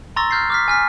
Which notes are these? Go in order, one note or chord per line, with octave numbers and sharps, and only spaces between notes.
A#5 C6 C#6 E6 A6 A#6
F6 G6 A6 C7
D6 F6 B6
G#5 F6 B6